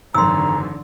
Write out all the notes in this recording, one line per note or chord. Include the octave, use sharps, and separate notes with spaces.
G#1 F#2 D3 E3 F#3 A#5 C6 E6